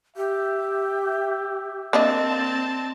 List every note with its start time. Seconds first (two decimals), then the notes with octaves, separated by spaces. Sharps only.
0.17 G4 E5
1.93 A#3 C4 D4 D#5 A5